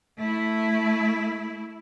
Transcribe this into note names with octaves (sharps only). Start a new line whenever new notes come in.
A3 E4